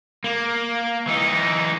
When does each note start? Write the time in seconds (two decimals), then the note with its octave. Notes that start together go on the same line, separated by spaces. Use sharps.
0.24 A#3
1.07 E3 D#4